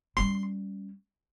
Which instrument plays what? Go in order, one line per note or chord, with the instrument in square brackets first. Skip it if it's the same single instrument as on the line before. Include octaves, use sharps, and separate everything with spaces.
[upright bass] G3 C#4 [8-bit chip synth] C6